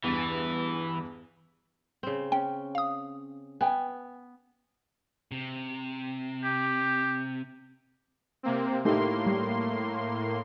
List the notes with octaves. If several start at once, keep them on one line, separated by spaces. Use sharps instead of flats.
E2 G2 E3 A6
C#3 C4
C#4 G5
F5 D#6
B3 G5 G#5
C3
G4
C3 A#3 C4
A2 A3 A#3 D#4 G4 C6
G3